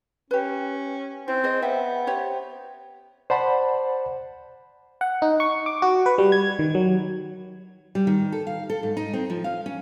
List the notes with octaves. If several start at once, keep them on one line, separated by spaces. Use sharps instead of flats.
C#4 G4 B4
C4 E4
G#4 C5 D#5
B3 E5 G5
G4 C5 C#5
C5 D5 F#5 A5 B5
F#5
D#4
C#6
D6
F#4
B4
G3
G#6
D#3
F#3
G3
D#3
A4
F5
A4
G#2
D#4
C4
F3
F5
C#4